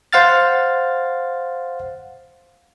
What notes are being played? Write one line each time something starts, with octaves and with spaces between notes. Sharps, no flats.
C5 F5 F#5 F6 A6